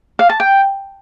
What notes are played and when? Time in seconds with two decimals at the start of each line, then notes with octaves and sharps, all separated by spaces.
0.19 F5
0.29 A5
0.40 G5